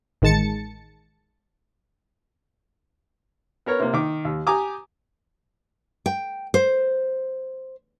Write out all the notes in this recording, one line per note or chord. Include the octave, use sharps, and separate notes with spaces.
A1 D#3 G#3 A5 A6 C#7
B3 A#4 C#5
C3 A#3
D#3 D6
D#2
G4 G#5 A#5 D6 D#6
G5
C5